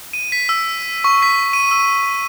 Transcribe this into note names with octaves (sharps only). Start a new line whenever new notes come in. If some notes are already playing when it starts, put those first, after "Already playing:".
D#7
B6
E6
C#6
B6
D#7
E6